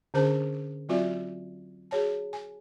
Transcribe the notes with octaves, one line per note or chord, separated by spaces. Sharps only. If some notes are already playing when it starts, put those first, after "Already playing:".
D3 C#4 D4 G#4 C5 A5
F#3 C4 F4 F#4 D5 E5
F#4 G#4 C#5 A5
G#5